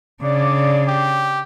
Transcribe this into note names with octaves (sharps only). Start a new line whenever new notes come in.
C#3 D4 D5 D6
G4